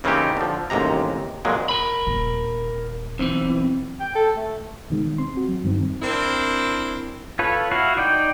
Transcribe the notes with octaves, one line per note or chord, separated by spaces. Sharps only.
C#3 E3 A#3 C4 D#4 G4
D3 F3
A1 D#2 G#2 C3 A#5
F2 A#2 F#3 G#3
A#4 B5
D#1
B1 E3 C4
G5
A4
A3
B2 D#3 G#3
D#3
C4 C6
F#4
F#3
G2 D#3 C4
C4 D4 E4 A#4
F4 A4 B4 C#5
E4 F#4 F5
D#4 D5 G5